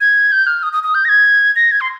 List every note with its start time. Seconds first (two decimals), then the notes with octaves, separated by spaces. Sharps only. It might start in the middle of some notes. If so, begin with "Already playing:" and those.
0.01 G#6
0.32 G6
0.47 F6
0.63 D#6
0.73 D#6
0.83 D#6
0.94 G6
1.05 A#6
1.09 G#6
1.56 A#6
1.71 G#6
1.81 C6